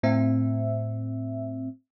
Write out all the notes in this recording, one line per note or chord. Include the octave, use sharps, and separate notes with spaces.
A2 C4 E5